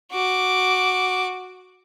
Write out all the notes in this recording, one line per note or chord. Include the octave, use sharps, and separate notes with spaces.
F#4 D6